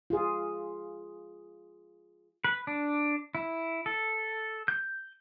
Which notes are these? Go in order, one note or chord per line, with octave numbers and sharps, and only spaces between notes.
F4 G#4
B4
D4
E4
A4
G6